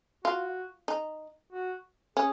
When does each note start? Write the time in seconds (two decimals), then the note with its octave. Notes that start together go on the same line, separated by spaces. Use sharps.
0.24 F4 F#4
0.88 D#4
1.53 F#4
2.16 C#4 G#4